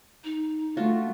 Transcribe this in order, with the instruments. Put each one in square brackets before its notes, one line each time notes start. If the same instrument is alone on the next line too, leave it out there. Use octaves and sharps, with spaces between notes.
[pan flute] D#4
[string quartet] A3 [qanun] D4 F4 F#4